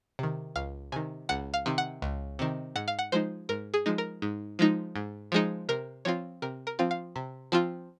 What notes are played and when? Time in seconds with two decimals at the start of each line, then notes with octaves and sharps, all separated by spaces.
0.19 C3 D#3
0.56 C#2 F5
0.92 C3 D#3 G#5
1.29 C#2 F#5
1.54 F5
1.66 C3 D#3
1.78 F#5
2.02 C#2
2.39 C3 D#3
2.76 G#2 F#5
2.88 F5
2.99 F#5
3.12 F3 G#3 D#4 C5
3.49 G#2 A#4
3.74 G#4
3.86 F3 G#3 D#4
3.98 A#4
4.22 G#2
4.59 F3 G#3 D#4
4.96 G#2
5.32 F3 G#3 D#4
5.69 C3 A#4
6.05 F3 C4 F4 C#5
6.42 C3 A#4
6.67 A#4
6.79 F3 C4 F4
6.91 F5
7.16 C3
7.52 F3 C4 F4